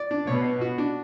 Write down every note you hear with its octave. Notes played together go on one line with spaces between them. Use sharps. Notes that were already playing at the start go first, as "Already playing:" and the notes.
Already playing: D5
D4
B2 C#5
B3
F#4
D4